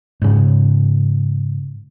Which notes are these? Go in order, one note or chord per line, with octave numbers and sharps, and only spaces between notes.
G#2 C#3